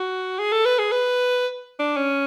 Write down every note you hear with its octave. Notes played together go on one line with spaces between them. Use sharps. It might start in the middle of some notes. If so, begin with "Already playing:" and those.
Already playing: F#4
G#4
A4
B4
G#4
B4
D4
C#4